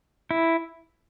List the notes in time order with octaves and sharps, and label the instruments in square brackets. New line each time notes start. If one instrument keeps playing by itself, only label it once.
[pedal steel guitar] E4